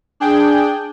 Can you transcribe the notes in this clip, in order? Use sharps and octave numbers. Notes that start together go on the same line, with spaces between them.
D4 G#4 G5